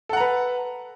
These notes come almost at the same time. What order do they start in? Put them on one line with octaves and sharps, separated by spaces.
A4 F#5 A#5 B4